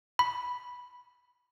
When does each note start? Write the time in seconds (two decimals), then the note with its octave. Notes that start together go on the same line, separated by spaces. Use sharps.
0.19 B5